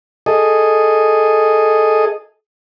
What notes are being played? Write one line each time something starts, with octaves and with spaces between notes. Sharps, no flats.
G#4 A4 D#5